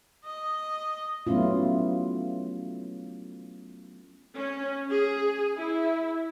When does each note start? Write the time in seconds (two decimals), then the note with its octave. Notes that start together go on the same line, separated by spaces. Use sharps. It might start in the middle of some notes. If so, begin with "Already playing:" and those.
0.24 D#5
1.27 F#3 A3 B3 C#4 E4 F4
4.34 C#4
4.89 G#4
5.58 E4